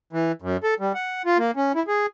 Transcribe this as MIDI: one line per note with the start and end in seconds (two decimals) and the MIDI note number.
0.13 0.32 52
0.42 0.57 42
0.64 0.74 69
0.80 0.92 55
0.95 1.22 78
1.26 1.38 65
1.38 1.51 58
1.56 1.72 61
1.75 1.83 64
1.88 2.06 68